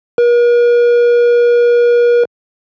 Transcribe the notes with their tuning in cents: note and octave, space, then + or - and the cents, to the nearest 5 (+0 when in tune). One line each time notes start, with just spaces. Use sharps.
A#4 +45